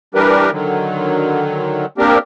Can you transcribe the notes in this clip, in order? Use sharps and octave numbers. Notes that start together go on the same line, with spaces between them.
E3 G3 D4 G4 A#4 B4
D3 D#3 F#3
A#3 C4 D4 G4 A#4